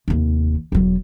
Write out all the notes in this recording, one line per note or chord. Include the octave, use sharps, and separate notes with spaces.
F1 D#2
E1 F#3